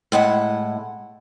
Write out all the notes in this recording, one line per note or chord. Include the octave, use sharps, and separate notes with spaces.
A2 G#3 E4 F#5